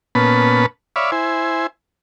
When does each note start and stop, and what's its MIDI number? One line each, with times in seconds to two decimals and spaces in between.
0.15 0.66 46
0.15 0.66 59
0.15 0.66 61
0.15 0.66 71
0.15 0.66 81
0.15 0.66 83
0.96 1.11 73
0.96 1.11 74
0.96 1.11 76
0.96 1.11 77
0.96 1.11 83
1.12 1.67 64
1.12 1.67 72
1.12 1.67 80